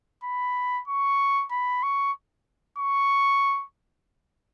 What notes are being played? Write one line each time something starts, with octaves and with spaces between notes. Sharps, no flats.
B5
C#6
B5
C#6
C#6